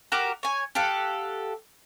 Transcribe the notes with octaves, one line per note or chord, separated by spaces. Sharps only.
F#4 G4 A#4 D6
C#5 G#5
G4 A4 F5 F#5